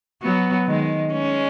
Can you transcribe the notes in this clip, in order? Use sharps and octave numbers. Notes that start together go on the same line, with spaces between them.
F#3 B3
D#3 G#3
G#3 C#4